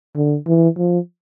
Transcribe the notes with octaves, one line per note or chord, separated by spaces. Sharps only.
D3
E3
F3